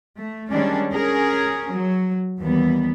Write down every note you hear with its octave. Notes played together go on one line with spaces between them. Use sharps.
A3
D#3 G3 G#3 C#4 D4
C#4 G#4 A#4
F#3
D#2 E3 G3 B3